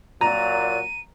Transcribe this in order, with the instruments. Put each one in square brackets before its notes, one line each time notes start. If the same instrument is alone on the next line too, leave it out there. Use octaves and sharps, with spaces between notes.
[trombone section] A#2 F#3 [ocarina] D5 [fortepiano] A#5 [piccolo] D#7